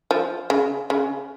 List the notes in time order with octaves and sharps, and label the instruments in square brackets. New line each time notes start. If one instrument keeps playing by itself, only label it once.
[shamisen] F3
C#3
C#3